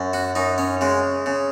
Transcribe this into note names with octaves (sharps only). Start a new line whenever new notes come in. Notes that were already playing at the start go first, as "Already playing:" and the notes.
Already playing: F#2
F#4
F#2 D#4
C#4
C#3 G#3
C#3